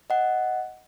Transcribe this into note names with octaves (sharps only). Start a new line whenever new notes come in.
D#5 F#5